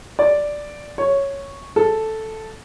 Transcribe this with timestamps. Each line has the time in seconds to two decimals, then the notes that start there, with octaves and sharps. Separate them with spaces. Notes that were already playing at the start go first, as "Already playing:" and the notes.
0.19 D5
0.98 C#5
1.76 A4